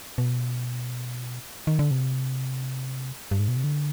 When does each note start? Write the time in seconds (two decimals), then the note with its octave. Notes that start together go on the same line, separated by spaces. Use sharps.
0.18 B2
1.67 D#3
1.79 D3
1.91 C3
3.31 G2
3.40 G#2
3.48 B2
3.56 C3
3.64 D3